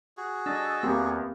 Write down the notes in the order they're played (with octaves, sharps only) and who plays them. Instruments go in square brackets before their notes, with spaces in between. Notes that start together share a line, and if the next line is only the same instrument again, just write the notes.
[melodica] F#4 G#4
[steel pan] D4 [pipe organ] D#5 A5 E6
[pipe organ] E2 [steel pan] A#3 C4 G4